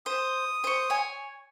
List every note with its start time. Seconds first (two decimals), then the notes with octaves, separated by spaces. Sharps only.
0.06 C5 D#6
0.64 C5 C#6
0.90 C#5 G#5